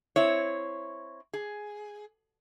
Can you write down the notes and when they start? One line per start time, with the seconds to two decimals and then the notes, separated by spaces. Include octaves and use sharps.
0.16 C4 E4 C#5
1.33 G#4